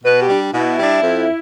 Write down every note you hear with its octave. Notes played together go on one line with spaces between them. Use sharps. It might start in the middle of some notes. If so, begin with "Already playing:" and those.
B2 B4
G4
G3 D4
B2 E4
G3 D4
F2